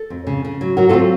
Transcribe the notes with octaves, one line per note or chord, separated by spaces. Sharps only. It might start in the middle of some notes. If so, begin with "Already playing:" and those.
Already playing: A4
F2
C#3
C#3
F#3
F#3 F#4 A#4
F4 A4
C4